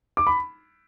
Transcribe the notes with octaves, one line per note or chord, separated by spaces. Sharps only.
D6
B5